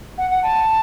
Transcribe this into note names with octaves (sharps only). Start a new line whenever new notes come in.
F#5
F#5
A5